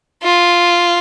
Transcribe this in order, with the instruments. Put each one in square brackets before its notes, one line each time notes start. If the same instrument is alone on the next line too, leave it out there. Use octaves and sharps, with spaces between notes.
[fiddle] F4